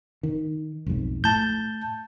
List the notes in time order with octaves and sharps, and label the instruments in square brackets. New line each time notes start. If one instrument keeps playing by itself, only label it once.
[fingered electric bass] D#3
B1 F2 G#2
[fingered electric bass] A2 [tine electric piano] A5 G6